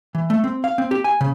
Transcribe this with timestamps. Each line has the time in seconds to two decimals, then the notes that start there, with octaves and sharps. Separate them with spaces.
0.15 E3
0.30 A3
0.44 C4
0.64 F5
0.78 C4
0.91 G4
1.04 G#5
1.21 C#3